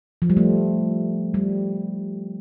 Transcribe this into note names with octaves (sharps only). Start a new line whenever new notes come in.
F3
G3
A3
G3